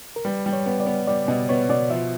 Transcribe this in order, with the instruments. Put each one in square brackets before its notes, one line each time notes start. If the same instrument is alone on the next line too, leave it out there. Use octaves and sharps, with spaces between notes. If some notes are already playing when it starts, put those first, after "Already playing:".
[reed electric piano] A#4
[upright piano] G3 [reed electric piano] B4
[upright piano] G3
[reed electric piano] C#5
[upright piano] B3
[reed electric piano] D5
[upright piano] B3
[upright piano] G3 [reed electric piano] D5
[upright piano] B2 [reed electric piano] D#5
[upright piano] B3 [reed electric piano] C#5
[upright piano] B2 [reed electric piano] D5
[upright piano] F3 [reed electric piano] E5